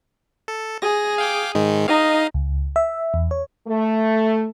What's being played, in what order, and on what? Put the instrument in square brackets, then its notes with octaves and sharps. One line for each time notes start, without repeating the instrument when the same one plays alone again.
[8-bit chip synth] A4
[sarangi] G#4 [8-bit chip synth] A#6
[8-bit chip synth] F5 G5 D6
G#2 D#3 G#3
[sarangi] D#4 [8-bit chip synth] D#5 F5
[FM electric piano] C#2
E5
E2
C#5
[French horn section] A3